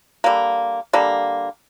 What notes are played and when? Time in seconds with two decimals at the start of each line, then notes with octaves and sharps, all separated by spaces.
0.24 D3 G3 A#3
0.93 D3 G3 A#3